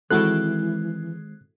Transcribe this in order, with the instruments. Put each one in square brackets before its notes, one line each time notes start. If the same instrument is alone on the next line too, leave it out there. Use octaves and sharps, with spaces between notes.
[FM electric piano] D#3 G#3 C4 [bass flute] E3 [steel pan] E4 F#4 A4 [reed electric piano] F#6